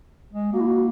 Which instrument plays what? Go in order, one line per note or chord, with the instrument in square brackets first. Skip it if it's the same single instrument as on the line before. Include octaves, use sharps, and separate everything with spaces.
[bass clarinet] G#3
[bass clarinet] A#3 [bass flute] F#4
[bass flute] E4
F#4